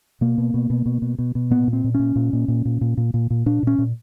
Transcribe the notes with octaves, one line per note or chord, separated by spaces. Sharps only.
B2 A#3
B2
B2
B2
B2
B2
B2
B2
A#2 B3
A#2
C4
A#2
A#2 C#4
A#2
A#2
A#2
A#2
A#2
A#2
A#2
A#2
A#2 D4
A#2 C#4
A#2